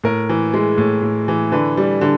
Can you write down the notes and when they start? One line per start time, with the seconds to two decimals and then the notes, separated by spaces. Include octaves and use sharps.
0.04 A2 A#4
0.29 E3
0.54 G#3
0.78 A2
1.02 A2
1.28 E3
1.52 D3 B4
1.77 G3
2.01 D3